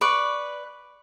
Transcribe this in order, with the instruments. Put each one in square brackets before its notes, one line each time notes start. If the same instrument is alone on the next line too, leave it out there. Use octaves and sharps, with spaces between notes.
[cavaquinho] B4 D5 C#6